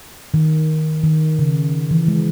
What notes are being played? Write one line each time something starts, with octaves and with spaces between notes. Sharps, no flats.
D#3
D#3
C#3
E3
G#3